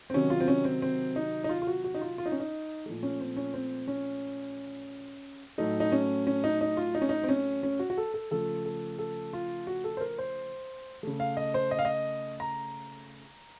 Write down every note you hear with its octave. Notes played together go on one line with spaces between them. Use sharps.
C4
C3 D#3 F#3 C#4
F4
C4
C#4
C4
C4
D#4
D#4
F4
F4
F#4
F#4
D#4
F4
F4
D#4
C#4
D#4
A#2 F3 A3
C#4
C4
C#4
C4
C#4
A2 F#3 A3 D#4
D#4
C#4
C#4
D#4
D#4
F4
D#4
C#4
D#4
C4
C#4
C#4
F#4
F#4
A4
A4
C#3 F3 A3 A4
A4
A4
F4
F#4
A4
C5
A#4
C5
C#3 A3
F5
D#5
C5
D#5
F5
D#5
A#5